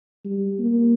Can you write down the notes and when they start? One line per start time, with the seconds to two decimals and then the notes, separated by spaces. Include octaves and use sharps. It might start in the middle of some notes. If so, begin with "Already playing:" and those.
0.25 G3
0.59 A#3